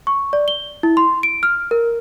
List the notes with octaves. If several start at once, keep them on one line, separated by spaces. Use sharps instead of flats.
C#6
D5
G7
E4
C6
D7
F6
A#4